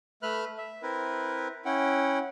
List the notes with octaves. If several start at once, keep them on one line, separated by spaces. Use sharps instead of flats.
A3 B4 E5 B5 F6 F#6
E5
C4 E4 A#4 B4
C#4 E4 F#5 G5